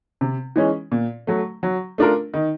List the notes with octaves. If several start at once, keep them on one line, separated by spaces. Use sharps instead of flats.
C3
E3 G#3 C#4
A#2
F#3 A3
F#3
A3 D4 F4 A#4
D#3